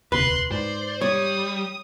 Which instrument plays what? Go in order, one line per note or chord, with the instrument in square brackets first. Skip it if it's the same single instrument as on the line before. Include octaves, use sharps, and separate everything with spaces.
[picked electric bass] E1 D2 C3 [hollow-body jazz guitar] B4 [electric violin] C6 F#6
[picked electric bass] G#2 [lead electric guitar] C5 [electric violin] D5
[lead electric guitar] G3 [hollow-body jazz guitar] C#5 [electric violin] D#6